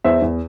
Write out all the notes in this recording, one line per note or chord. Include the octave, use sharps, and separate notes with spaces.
E2 C5 E5
E2